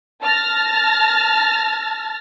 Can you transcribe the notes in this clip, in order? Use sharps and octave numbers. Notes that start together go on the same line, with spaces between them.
A5 F6 A6 A#6